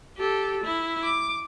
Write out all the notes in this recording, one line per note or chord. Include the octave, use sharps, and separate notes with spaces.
G4 A4
E4
D6